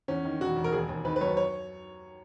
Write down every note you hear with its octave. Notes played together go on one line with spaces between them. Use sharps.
E2 C#4
D#3
E1 F#4
E1
A#4
D#2 G#4
D#2
D#3 B4
B4
F#2 C#5
C#5